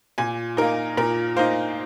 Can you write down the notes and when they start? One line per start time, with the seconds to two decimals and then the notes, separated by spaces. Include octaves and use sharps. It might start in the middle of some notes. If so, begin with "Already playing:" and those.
0.18 A#2 G#5
0.57 A#3 D#4 A#4
0.97 A#2 A#4
1.36 A#3 D#4 C5